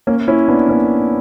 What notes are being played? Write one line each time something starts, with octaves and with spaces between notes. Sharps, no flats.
A#3 C#4
C#4 E4
B3 D4
A#3 C#4